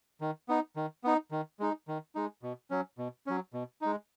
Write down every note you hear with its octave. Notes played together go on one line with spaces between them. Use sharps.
D#3
B3 D#4
D#3
B3 D#4
D#3
G#3 D#4
D#3
G#3 D#4
B2
F#3 C#4
B2
F#3 C#4
B2
G#3 D#4